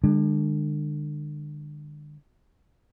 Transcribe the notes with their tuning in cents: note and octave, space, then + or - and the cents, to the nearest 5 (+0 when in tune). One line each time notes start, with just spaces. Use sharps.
D3 +30 G#3 -35